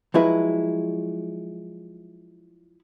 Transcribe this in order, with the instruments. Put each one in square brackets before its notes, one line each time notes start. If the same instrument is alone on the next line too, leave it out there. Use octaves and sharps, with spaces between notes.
[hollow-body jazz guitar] F3 F#3 G#3 E4 B4